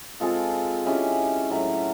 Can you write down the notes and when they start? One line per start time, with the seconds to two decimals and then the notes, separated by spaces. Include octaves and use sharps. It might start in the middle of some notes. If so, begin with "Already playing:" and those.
0.20 G#3 C4 F4 A4
0.85 G#3 C#4 E4 G4
1.50 A2 F#3 A3